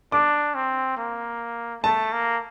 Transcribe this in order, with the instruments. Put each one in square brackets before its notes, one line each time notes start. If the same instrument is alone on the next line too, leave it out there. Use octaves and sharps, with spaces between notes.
[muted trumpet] D4 [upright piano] D6
[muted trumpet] C4
A#3
[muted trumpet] A3 [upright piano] A5
[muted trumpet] A#3